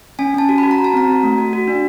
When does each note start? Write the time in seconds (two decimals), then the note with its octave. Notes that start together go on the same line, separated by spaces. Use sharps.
0.19 C#4 G#5
0.34 C#4 A5
0.49 F#4
0.58 B5
0.63 F#4
0.71 A#5
0.78 F#4
0.84 A5
0.94 C4 A#5
1.08 F#4
1.23 A3
1.38 F#4
1.53 F#4
1.68 D4